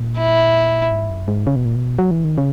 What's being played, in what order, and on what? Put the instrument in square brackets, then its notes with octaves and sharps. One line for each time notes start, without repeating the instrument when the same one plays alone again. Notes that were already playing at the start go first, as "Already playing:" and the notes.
Already playing: [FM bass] A#2
[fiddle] E4
[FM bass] G#2
F#2
G#2
C#3
B2
A#2
B2
F#3
E3
D#3
C#3